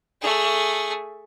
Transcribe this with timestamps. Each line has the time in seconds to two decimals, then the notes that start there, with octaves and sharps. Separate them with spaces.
0.21 A3 G#4